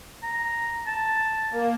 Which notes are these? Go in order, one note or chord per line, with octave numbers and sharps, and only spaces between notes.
A#5
A5
A#3